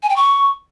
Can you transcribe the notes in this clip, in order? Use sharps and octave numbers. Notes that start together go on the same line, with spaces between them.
G#5
G5
C#6